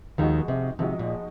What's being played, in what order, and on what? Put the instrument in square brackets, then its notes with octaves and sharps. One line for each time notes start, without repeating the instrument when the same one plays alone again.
[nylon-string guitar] D#2 D#3 [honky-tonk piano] F3 G#3 D#4 F#4
[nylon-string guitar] C3
[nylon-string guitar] C3 [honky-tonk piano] F3 G#3 D#4 F#4
[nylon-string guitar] A#2